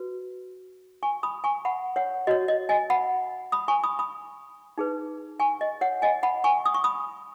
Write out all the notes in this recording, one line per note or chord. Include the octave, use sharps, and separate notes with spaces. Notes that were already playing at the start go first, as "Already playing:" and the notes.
Already playing: F#4 B4
G#5 C#6
B5 D#6
G#5 C#6
F#5 B5
C#5 F#5
F#4 C#5 D#5
D#5
D#5 G#5
F#5 B5
B5 D#6
G#5 C#6
B5 D#6
B5 D#6
D#4 G#4 B4
G#5 C#6
D#5
C#5 F#5
D#5 G#5
F#5 B5
G#5 C#6
D#6
C#6
B5 D#6